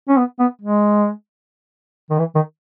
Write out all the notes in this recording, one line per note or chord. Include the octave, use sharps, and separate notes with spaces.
C#4
B3
B3
G#3
D#3
E3
D#3